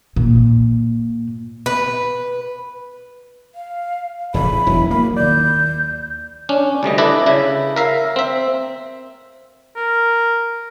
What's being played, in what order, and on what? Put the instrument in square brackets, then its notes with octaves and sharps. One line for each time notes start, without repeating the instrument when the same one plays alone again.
[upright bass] A#2
[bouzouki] B4
[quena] F5
[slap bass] F1 A2 E3 [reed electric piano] G#4 [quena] B5
[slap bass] E1 [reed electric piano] F#3 E4
[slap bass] A#3 [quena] B5
[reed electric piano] D#2 D5 [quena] G6
[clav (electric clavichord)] C#4 D4
D2 C3 G3 D#5
D4 E4 A4 B4 D5 D#5
C#3 E4
A#4 E5 F5
C4 E5
[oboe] A#4